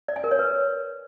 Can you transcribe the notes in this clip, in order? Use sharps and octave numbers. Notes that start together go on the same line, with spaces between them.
D5
G#5
A#4
C#5
B4